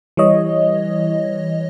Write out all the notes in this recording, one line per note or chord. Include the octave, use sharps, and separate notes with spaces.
E3 G3 C#5 D#5